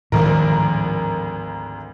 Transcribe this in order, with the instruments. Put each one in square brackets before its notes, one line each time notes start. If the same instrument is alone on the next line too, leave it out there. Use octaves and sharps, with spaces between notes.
[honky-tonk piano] G#1 D2 A#4 [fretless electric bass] A2 D#3 F3